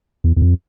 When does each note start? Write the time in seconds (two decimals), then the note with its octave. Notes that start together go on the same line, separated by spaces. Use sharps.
0.24 E2
0.37 E2
0.42 F2